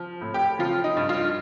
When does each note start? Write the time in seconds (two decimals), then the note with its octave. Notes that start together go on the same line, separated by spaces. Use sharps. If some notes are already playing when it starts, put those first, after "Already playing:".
Already playing: F3
0.21 A2
0.34 G4
0.59 F3 F4
0.84 D#4
0.97 G2
1.09 F4